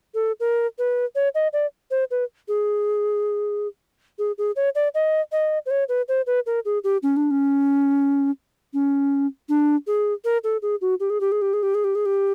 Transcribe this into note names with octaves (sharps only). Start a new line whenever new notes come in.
A4
A#4
B4
C#5
D#5
D5
C5
B4
G#4
G#4
G#4
C#5
D5
D#5
D#5
C5
C#5
B4
C5
B4
A#4
G#4
G4
C#4
D4
C#4
C#4
D4
G#4
A#4
A4
G#4
F#4
G4
G#4
G4
G#4
G4
G#4
G4
G#4
G4
G#4
G4